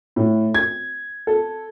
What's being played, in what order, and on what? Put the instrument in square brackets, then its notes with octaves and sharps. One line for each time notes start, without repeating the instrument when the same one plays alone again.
[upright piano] A2
G#6
A4